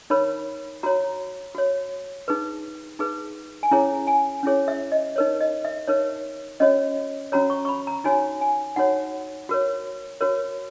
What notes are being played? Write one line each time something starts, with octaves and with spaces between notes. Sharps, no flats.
D#4 A#4 C#5 B5
F#4 C#5 A#5
F#4 C#5
D#4 G#4 B4
D#4 G#4 B4
G#5
C#4 E4 G#4 C#5 A#5
G#5
C#4 E4 G#4 C#5
E5
D#5
D#4 A#4 C#5
D#5
E5
D#4 A#4 C#5
C#4 F#4 C#5 D#5
C#4 F#4 C#5 A#5
C#6
C#6
B5
A#5
D#4 F#4 C#5 G#5
G#5
D#4 F#4 C#5 F#5
F#4 A#4 C#5
F#4 A#4 C#5